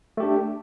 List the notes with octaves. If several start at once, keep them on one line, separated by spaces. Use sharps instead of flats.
A3 D4 G4